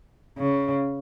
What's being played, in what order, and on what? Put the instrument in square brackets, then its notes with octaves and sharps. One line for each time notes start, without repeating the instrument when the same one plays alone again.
[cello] C#3